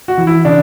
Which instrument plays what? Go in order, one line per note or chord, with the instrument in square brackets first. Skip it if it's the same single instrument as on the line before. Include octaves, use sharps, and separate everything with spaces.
[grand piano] F#4
E3
E4
C#3 D4